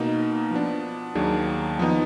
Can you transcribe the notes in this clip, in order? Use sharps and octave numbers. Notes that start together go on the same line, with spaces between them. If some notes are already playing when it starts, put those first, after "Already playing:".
Already playing: B2 A#3 D#4
F3 B3 D4
D#2 D#3 F#3 D4 G#4
F3 B3 D#4